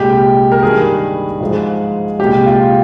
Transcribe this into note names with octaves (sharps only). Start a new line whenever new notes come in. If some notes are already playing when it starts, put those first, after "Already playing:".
Already playing: C2 A#2 G#3 G4
A#4
G2 D#3 G3 G#4
G#2 F3 G#3
C2 A#2 G#3 G4
F4